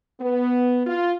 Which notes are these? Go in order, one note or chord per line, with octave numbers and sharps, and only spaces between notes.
B3
F4